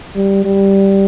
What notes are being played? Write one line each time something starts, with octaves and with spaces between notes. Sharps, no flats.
G3
G3